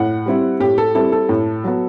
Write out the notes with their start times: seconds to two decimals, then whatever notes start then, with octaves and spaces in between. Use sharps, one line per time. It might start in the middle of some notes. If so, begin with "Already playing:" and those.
Already playing: A2 F#5
0.26 G3 C4 E4
0.60 A2 G4
0.78 A4
0.95 G3 C4 E4 A4
1.12 A4
1.29 A2
1.64 F#3 B3